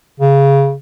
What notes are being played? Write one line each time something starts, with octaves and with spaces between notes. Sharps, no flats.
C#3